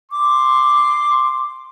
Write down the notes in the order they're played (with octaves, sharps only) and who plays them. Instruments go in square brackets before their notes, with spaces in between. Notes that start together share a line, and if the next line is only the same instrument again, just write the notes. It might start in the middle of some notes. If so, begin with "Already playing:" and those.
[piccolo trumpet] C6 [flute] D6